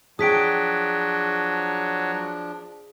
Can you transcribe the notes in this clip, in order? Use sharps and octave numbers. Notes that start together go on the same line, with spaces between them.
F3 F#3 D4 G#4 G5 D#6 B6 D7